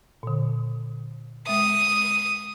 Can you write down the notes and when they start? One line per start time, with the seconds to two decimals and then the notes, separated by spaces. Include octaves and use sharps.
0.23 A#2 D3
1.47 G#3 E5 D#6